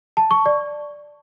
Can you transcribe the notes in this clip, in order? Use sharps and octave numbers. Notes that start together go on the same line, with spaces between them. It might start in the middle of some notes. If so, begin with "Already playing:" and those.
A5
C#6
D5